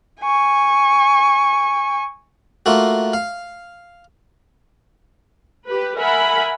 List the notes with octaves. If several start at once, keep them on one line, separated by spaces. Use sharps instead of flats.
G#5 C#6
A3 A#3 F4 F#4
F5
G4 B4
A#4 E5 F#5 G#5 B5